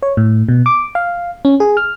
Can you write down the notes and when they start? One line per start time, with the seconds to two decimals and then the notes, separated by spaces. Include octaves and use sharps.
0.03 C#5
0.17 A2
0.49 B2
0.66 D6
0.95 F5
1.45 C#4
1.60 G#4
1.77 F6